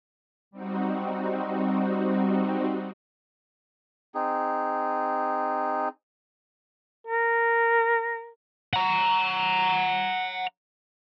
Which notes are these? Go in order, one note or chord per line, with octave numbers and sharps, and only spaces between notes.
G3 C4 D#4 F#4
C4 D#4 G#4
A#4
F#5 A#5